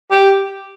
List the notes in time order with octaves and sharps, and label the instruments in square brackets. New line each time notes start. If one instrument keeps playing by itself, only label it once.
[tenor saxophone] G4